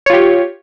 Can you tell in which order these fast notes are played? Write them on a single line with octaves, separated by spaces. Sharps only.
C#5 F4 G4